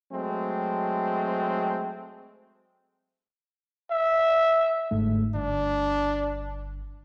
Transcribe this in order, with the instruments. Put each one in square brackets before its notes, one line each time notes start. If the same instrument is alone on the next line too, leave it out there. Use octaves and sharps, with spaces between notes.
[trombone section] F#3 G#3 A3 C4
[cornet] E5
[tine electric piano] G1 G#2 A3
[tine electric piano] G1 [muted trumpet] D4